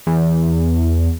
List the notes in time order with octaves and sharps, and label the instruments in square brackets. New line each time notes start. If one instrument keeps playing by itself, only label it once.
[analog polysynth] E2